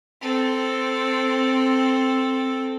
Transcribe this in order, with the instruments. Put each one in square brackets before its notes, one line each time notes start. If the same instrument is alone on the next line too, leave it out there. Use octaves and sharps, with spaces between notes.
[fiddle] C4 A4